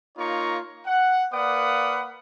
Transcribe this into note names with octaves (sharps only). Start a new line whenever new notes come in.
A#3 D#4 F4 C#5 A#5 C#6
F#5
A#3 B4 D5 F5 F#5 D#6